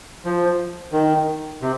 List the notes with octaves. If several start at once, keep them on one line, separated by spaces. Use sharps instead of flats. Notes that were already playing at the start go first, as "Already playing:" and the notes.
F3
D#3
C3